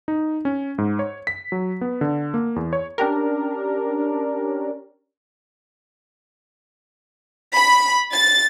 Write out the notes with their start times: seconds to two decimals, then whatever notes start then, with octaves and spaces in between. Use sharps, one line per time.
0.08 D#4
0.45 C#4
0.78 G#2
0.99 C#5
1.27 B6
1.52 F#3
1.81 B3
2.01 D3
2.34 A#3
2.56 E2
2.73 C#5
2.98 C#4 D4 G4 A#4
7.54 B5
8.12 A6